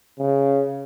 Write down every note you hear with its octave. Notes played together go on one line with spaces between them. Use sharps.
C#3